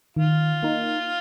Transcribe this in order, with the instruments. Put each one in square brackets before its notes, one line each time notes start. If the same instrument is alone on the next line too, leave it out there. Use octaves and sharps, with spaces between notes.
[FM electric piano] D#3 [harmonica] F4
[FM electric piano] A#3 D#4